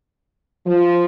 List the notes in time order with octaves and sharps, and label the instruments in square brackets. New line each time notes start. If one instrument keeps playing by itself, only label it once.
[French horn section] F3